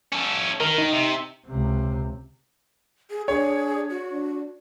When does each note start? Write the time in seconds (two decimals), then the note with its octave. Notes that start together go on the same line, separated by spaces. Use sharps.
0.12 C#4 A4
0.60 D#3 A#4
0.78 D#4
0.92 C3
1.47 C#2 C3
3.10 G#4
3.28 D4 G#4 C#5
3.90 F#4
4.09 D4